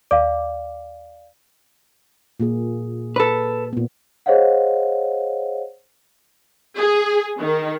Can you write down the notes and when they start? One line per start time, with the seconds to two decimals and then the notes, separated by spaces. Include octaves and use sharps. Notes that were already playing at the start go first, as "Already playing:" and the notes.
0.11 D#2 D5 F5 D6
2.40 A#2 A#3 G#4
3.16 A4 B4
3.73 A#2 B3
4.26 G#4 C5 C#5 D#5 F5 F#5
6.76 G#4
7.39 D#3